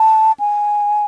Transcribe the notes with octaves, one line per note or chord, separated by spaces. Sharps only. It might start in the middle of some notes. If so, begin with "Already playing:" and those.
Already playing: A5
G#5